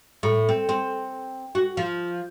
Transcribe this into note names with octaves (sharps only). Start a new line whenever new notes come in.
A2
C4
C4
F#4
F3